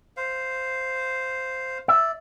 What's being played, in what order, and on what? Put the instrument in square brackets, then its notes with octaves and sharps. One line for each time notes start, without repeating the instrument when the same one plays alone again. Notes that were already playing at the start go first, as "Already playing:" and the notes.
[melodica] C5 F5
[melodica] D5 [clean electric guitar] E5